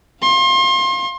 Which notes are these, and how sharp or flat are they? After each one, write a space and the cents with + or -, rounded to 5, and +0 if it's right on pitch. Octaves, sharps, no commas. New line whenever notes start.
F5 +0 C6 +35